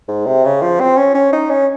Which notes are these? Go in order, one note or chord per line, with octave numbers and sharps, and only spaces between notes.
G#2
C3
C#3
F3
C4
C#4
C#4
D#4
C#4